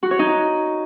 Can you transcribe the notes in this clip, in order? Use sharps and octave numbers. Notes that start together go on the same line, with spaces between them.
F#4
C#5
D#4